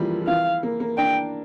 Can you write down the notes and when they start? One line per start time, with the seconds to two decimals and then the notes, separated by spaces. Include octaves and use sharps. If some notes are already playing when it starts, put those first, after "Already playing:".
Already playing: E3 F3 G3 A#3
0.10 F3
0.22 F3
0.27 E3 F5
0.63 A#3
0.80 A#3
0.98 D4 G5